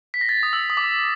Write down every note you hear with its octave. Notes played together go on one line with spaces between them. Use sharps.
B6
A#6
A6
D#6
E6
D#6
D6